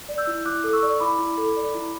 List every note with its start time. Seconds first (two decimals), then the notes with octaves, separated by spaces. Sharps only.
0.09 D5
0.18 E6 G6
0.27 E4
0.45 E4 D6 F#6
0.64 A4
0.73 C#6 E6
0.83 D5
1.00 E4 B5 D6
1.19 E4
1.37 A4
1.56 D5
1.74 E4